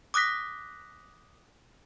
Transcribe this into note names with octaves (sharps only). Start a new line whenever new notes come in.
D6 D#6 F#6 A#6 B6